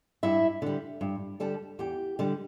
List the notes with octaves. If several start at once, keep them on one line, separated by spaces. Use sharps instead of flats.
G2 E4 E5
D3 G3
G2
D3 G3 A4 A5
E2 G4 G5
D3 G3